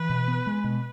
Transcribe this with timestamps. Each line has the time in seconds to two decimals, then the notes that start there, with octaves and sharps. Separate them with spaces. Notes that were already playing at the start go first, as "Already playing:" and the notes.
Already playing: E3 B4
0.10 B2
0.28 B3
0.47 G#3
0.64 B2